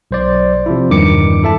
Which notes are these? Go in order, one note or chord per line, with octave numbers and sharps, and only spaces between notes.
B1 C5 D5
C3 F3 E4
E2 G2 D#3 D6 C#7
E4 A4 E5 A5